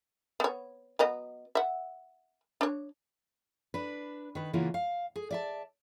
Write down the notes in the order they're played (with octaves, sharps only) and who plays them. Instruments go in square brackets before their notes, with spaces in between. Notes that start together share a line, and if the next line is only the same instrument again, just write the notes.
[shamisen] B3 C#5
F#3 B3 D#5
E5 F#5
D4 C#5
[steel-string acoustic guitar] D4 B4
D#3 B4
C#3 E3 A#3 B3 E4 F4
F5
G#4
D5 E5 A5